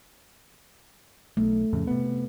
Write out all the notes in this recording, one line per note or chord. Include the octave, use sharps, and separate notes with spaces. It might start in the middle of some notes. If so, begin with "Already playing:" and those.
B1 A3
F2 A2 C#3
C3 B3